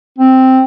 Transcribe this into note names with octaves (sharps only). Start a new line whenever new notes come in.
C4